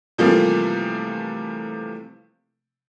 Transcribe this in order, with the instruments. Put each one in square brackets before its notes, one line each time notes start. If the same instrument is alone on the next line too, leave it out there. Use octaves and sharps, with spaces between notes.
[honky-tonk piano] C3 E3 F3 G3 A3 A#3